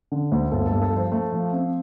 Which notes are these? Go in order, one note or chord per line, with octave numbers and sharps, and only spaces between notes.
D3
D2
G1 A4
A4
G2
A4
F3 C5
A3
F3
C4